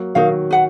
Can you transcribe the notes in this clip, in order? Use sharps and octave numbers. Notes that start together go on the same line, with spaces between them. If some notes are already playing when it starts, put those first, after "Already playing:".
Already playing: F#3 A#3
D#3 F#3 D#4 A#4 F5
B4 F#5